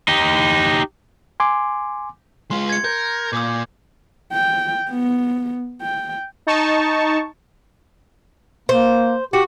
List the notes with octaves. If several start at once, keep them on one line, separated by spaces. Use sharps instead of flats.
D#4 G4
G#5 C6 D6
G#3 F4 C6
G#6 C#7
A#4 G6
A#2 D6 D#6
G5
B3
G5
D#4 A5 C#6
A#3 C5
F#4 G4